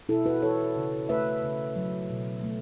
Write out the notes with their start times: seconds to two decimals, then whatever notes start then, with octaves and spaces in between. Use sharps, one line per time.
0.09 B2 E4 A4
0.26 F#4 B4
0.42 E3 A4 C#5
0.76 C#3
1.09 A3 B4 E5
1.43 C#3
1.76 F#3
2.10 B2
2.43 A3